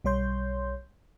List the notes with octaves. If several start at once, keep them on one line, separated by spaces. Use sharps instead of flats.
B1 G3 C#5 C6 G6